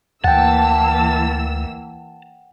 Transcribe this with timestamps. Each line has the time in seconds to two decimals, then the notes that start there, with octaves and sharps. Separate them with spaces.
0.24 D2 E3 A#3 F#5 G5 A5 E6